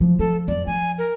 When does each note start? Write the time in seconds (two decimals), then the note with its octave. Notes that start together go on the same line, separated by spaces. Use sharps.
0.01 F3
0.19 F3 A4
0.48 F2 D5
0.67 F3 G#5
0.98 A#4